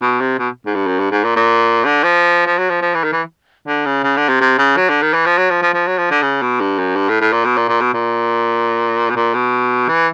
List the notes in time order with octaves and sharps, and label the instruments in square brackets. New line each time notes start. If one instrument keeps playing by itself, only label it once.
[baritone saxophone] B2
C3
B2
G#2
G2
F#2
G2
G#2
A#2
A#2
D3
F3
F3
F#3
F3
F3
E3
D#3
E3
D3
C#3
C#3
D3
C3
C3
C#3
F#3
D3
D#3
E3
F3
F#3
F3
F3
F3
F#3
F3
D3
C#3
B2
G2
F#2
G2
A2
A2
A#2
B2
A#2
A#2
B2
A#2
B2
A#2
B2
E3